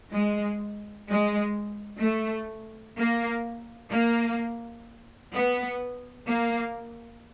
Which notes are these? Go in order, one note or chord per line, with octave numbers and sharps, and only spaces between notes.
G#3
G#3
A3
A#3
A#3
B3
A#3